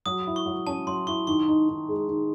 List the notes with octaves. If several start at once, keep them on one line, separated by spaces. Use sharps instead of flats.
F#3 D#6
E4
C#6
F#3
C#4 A5
F#3 C6
E4 C#6
D#3 C#6
D#4
D#3
G#3
D#3